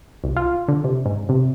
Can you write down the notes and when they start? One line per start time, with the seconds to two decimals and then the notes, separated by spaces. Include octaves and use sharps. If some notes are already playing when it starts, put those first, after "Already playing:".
0.24 C2
0.37 F4
0.68 D3
0.84 C3
1.06 G#2
1.29 C3